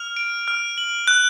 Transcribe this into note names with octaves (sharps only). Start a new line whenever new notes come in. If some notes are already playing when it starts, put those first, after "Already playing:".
Already playing: F6 F7
D7
F6
F#7
F#6